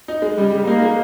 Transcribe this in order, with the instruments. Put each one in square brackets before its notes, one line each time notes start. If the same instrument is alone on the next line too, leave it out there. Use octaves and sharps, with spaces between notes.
[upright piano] D#4
G#3
[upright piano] C#3 [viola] G3
[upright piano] C#3
[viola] A#3 [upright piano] D#4
[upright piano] G#3